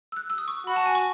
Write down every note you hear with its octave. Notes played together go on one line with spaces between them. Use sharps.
E6
F#6
E6
D#6
C#6
F#4 B5
A5
G#5
C#6